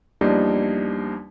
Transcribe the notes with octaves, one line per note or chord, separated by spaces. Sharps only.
E2 F3 G3 A#3 D4 D#4